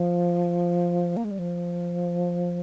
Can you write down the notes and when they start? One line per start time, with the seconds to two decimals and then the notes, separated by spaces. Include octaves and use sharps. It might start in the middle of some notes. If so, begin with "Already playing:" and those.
Already playing: F3
1.17 A#3
1.24 G#3
1.31 G3
1.39 F3